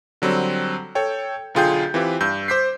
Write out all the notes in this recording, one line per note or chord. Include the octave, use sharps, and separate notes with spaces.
D3 F#3 G3 C4
A4 C#5 G5
B1 D3 F4 G#4 G5 G6
E3 C4 F4 G4 B4
G2 E6 G6
C5 D6 G6 B6 C7